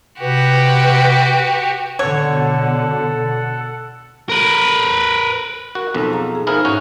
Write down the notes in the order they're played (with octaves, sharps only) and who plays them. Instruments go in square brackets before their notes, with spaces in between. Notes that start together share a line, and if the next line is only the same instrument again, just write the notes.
[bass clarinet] C3 [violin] F#4 G4 [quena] B4
[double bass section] B2 D3 [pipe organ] A4 F#5 [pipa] C#5
[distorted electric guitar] A#4 B4
[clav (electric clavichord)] F#4 [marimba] A#4
[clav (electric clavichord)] B1 F2 [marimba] A4 A5
[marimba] G#4 F5 A#5
G#4
[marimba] D#4 C5 F5 [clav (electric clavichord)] E4 G#4 A#4
[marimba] G#2 [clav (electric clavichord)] C#4 F#4